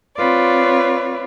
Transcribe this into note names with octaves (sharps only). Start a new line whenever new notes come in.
C4 F4 B4 C#5 D5